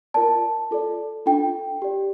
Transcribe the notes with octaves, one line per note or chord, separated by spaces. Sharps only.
F4 A#4 D5 A5
F4 A4 D5
D4 F4 A4 G5
G4 D5